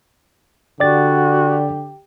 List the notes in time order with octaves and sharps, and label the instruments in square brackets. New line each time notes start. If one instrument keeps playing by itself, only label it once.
[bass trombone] D3 [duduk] F#4 [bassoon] G4 [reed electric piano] D5 A6